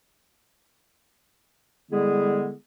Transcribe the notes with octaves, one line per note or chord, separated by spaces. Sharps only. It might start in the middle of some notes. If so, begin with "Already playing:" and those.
D3 G3 G#3 B3 E4 G#4